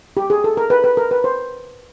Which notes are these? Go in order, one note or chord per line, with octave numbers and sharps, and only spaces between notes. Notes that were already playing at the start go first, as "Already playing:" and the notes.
G4
G#4
A4
A#4
B4
B4
A#4
B4
C5